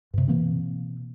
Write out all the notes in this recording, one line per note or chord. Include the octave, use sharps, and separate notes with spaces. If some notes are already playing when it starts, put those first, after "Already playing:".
G2 C3
B2 E3 A#3 C4